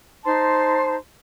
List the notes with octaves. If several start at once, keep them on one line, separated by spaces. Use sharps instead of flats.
D#4 C5 A5 C6